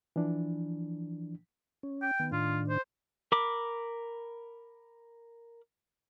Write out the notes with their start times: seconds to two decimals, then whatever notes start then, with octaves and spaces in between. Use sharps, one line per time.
0.16 E3 F3 D4
1.83 C#4
2.02 G5
2.19 D#3 B3
2.32 A2 D#3 D4 F4
2.69 C5
3.32 A#4 B5 D6